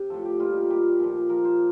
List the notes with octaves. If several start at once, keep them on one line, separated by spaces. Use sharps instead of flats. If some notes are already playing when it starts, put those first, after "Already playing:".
Already playing: C3
A2 F3 A4
G4
A#2 G3 F4
D#4
A#2 G3 G4
A#2 F3 A4
A#2 F3 A#4
C5